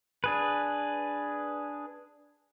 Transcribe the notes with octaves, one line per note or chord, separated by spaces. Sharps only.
D4 G#4 B4